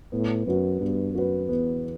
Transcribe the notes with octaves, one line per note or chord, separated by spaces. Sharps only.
A2 B3
F#2 F#4 B4
G2 B3
F#2 F#4 B4
E2 B3